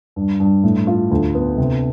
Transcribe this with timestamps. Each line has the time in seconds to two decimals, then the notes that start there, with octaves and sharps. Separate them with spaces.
0.16 G2
0.40 G2
0.64 A2
0.87 F4
1.11 D2
1.35 B3
1.58 C3